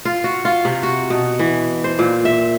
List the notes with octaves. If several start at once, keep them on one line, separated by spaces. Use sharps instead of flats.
F4
F#4
F4
C3
F#4
B2
E3
C5
A#2
E5